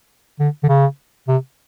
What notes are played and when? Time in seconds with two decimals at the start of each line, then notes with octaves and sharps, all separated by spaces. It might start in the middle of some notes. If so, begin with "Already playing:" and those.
0.40 D3
0.63 D3
0.69 C#3
1.28 C3